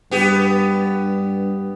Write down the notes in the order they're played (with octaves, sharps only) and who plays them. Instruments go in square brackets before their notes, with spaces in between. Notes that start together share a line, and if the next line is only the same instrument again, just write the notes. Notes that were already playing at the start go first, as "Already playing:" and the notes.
[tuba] G2 [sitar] B3 G4